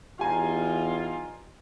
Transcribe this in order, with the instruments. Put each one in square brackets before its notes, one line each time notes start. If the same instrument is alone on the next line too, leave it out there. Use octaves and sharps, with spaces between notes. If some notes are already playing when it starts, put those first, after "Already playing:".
[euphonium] E2 [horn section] G3 D#4 F4 [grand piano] G4 G#5 A#5